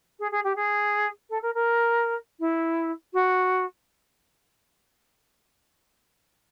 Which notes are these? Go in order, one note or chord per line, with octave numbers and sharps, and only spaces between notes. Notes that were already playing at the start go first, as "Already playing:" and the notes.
G#4
G#4
G4
G#4
A4
A#4
A#4
E4
F#4